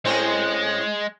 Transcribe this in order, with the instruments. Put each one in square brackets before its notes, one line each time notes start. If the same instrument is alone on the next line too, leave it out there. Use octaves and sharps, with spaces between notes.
[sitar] A2 C4 C#4 [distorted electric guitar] G#3